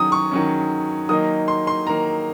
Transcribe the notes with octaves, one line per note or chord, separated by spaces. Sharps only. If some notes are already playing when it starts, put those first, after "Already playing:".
Already playing: D#3 F#3 C#4 D#6
C#6
D#3 F#3 C#4
D#3 F#3 A#3 D#4 D#6
C6
C6
D#3 F#3 A#3 D#4 A#5